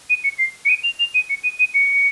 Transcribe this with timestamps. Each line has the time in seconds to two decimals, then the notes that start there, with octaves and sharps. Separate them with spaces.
0.10 D#7
0.24 C#7
0.39 C7
0.65 C#7
0.69 D#7
0.83 F7
0.99 F7
1.14 D#7
1.30 C#7
1.43 D#7
1.59 D#7
1.74 C#7